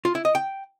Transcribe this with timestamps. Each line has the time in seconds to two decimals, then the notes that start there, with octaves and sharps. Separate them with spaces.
0.05 F4
0.15 E4
0.25 D#5
0.35 G5